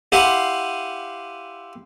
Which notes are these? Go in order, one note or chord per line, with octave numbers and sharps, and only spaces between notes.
E4 G4 F5 F#5 G#5 C6